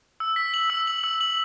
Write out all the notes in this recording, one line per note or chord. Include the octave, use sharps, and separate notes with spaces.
E6
B6
F#7
E6
F#7
E6
F#7